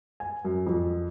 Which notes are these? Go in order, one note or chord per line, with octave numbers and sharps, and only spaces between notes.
G#5
F#2
F2